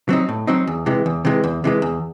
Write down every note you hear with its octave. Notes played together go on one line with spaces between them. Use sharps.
F#3 C4 D#4
A2
F#3 C4 D#4
E2
C3 E3 G#3
E2
C3 E3 G#3
E2
C3 E3 G#3
E2